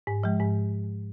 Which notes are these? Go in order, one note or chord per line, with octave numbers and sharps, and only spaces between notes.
G#2
F3 G#3
G#2